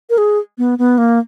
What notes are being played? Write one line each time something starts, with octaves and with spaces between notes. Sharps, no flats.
A#4
G#4
B3
B3
A#3